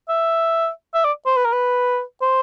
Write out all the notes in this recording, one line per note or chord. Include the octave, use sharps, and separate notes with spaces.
E5
E5
D5
C5
B4
A#4
B4
C5